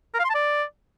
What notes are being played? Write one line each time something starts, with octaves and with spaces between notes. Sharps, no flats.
A#4
F5
C6
A5
D5